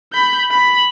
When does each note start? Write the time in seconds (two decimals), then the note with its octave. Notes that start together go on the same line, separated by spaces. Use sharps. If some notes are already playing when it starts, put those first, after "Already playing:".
0.12 B5 G6
0.51 B5